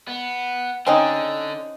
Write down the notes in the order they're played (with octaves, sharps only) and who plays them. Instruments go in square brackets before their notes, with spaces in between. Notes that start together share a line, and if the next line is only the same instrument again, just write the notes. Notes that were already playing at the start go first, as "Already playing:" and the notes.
[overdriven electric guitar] B3
[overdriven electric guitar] D3 [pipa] C4 C#4 D#4